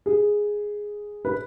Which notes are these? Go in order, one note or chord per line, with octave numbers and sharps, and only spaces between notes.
G#4
B4